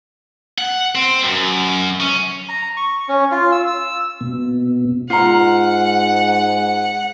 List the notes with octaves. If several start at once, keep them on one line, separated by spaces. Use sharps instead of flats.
F#5
C4
F#2
C#4
A#5
C#6
C#4
F4
E6
E6
B2
G#2 F4 F#5 A#5